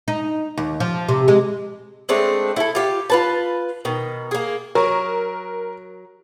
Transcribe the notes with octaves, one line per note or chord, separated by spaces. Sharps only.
D#4
D#2
F3
C3
G#3
G#3 A3 C4 D4
E4 A4
F4 G4 F5
F4 B4 A5
B2 D#3
A#3 G#4
F#3 A#4